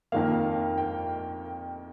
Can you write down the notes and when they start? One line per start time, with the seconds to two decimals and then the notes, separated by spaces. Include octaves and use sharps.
0.12 F2 D#3 A#3 F5
0.78 G5